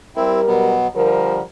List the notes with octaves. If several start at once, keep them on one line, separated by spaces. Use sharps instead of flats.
G3 C4 E4 A#4
B2 F#3 B3
D3 F3 G3 A#4